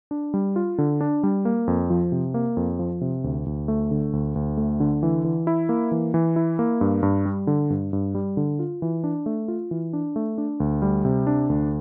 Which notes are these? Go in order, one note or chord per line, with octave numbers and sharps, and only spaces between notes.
D4
G3
F4
D3
D4
G3
A#3
F2
F3
C3
A#3
F2
F3
C3
D2
D2
A3
D3
D2
D2
A3
D3
E3
E3
E4
A#3
E3
E3
E4
A#3
G2
G2
G3
D3
G2
G2
G3
D3
F4
E3
D4
A3
F4
E3
D4
A3
D4
D2
G3
C3
D4
D2